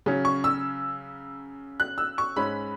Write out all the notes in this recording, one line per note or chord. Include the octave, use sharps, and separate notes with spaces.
C#3 F#3 C#4
C#6
E6
F#6
E6
C#6
G#2 G#3 C#4 B5